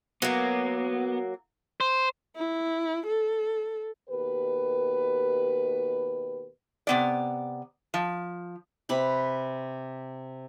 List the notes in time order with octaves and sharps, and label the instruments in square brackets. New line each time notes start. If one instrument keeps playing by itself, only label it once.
[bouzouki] F#3 A#3 [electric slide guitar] B3
[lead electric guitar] C5
[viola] E4
A4
[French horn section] D#2 B2 G4 A#4 B4
[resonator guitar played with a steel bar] C3 B3 D5
F3
[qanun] C3 B4 B5